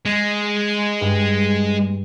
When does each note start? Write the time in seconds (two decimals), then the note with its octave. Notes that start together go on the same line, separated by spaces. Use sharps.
0.06 G#3
1.01 G2